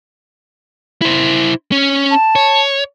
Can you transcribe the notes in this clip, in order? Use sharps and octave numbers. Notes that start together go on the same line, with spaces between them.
E4 C5
C#4
A5
C#5